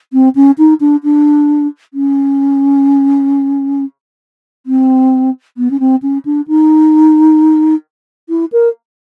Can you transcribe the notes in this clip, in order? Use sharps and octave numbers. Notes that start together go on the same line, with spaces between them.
C4
C#4
D#4
D4
D4
C#4
C4
B3
C#4
C4
C#4
D4
D#4
E4
A#4